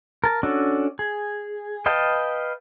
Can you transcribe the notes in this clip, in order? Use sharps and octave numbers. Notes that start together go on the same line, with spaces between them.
A#4 A5
C#4 D4 F#4 A4
G#4
B4 D#5 F5 G5 A5